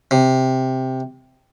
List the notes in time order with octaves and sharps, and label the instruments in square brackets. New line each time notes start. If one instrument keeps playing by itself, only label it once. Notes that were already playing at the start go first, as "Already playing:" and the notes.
[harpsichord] C3